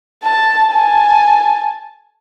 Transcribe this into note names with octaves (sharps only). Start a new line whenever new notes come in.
A5
G#5 A5